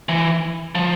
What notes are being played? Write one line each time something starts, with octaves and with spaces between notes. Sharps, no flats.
E3
F3